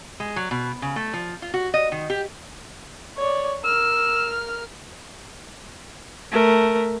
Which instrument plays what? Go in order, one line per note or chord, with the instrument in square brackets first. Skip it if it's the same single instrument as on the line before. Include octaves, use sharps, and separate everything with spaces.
[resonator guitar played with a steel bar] G#3
F#3
B2
C#3
A3
F3
F4
F#4
D#5
D#3
G4
[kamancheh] C#5 D5
[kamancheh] A#4 F6 [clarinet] E6
[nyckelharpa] A3 A#4